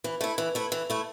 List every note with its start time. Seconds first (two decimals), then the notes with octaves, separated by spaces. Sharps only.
0.04 E3
0.21 A3 E4
0.38 E3
0.55 A3 E4
0.72 E3
0.90 A3 E4